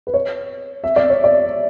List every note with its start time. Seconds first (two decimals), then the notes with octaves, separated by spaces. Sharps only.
0.07 B4
0.14 C#5
0.84 E5
0.96 D5
1.10 C#5
1.24 D5